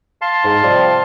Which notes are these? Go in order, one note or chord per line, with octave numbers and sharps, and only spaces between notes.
F5 A5 C6
G#2
C3 F3 G3